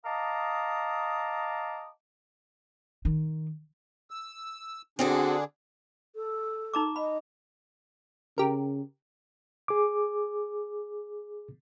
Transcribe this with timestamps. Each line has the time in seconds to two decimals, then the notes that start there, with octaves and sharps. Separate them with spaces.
0.04 D#5 F5 A5 A#5 D6 D#6
3.05 D#3
4.11 E6
4.99 D3 C4 D4 F#4 G#4 A4
6.15 A4
6.74 D#4 A#5 D6
6.96 D#5 B5
8.38 C#3 G4 A#4
9.68 G#4 D6